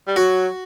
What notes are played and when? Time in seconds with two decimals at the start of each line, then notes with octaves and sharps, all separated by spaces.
0.07 G3
0.16 F#3 F#4